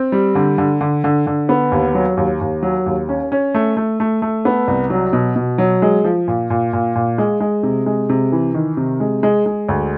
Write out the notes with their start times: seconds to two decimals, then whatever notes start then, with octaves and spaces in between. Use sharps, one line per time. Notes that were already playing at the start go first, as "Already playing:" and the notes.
Already playing: C4
0.12 G3
0.35 D3
0.58 D3
0.81 D3
1.04 D3
1.27 D3
1.49 B3
1.72 D#2
1.95 F#3
2.17 D#2
2.41 D#2
2.63 F#3
2.86 D#2
3.09 C#4
3.32 C#4
3.54 A3
3.77 A3
4.00 A3
4.22 A3
4.45 B3
4.68 C2
4.90 F#3
5.13 B2
5.36 B2
5.58 F#3
5.82 G#3
6.04 F3
6.28 A#2
6.50 A#2
6.73 A#2
6.95 A#2
7.18 G#3
7.40 G#3
7.63 C3
7.86 G#3
8.09 C3
8.32 E3
8.54 D#3
8.77 C3
9.00 G#3
9.23 G#3
9.46 G#3
9.69 D2